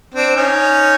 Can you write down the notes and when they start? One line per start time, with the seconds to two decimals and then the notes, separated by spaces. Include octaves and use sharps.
0.15 C4 D4
0.36 C#4 D#4